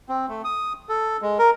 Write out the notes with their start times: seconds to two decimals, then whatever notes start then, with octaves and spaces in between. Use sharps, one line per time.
0.09 C4
0.29 A3
0.44 D#6
0.89 A4
1.22 G#3
1.39 A#4